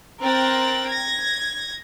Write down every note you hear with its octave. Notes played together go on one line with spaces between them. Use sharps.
C4 A#4 G5 F#6 A6
G#6 A#6